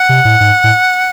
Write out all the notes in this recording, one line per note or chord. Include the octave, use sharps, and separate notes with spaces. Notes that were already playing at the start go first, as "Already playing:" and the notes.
Already playing: F#5
C3
A2
G#2
A2